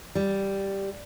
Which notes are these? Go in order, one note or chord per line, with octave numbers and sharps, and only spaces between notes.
G3